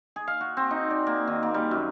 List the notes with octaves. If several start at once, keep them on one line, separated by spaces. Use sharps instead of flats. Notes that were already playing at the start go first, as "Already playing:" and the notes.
G#4
F5
F#4
C4
D#4
D5
A#3
D#3
A#3
G3
F#2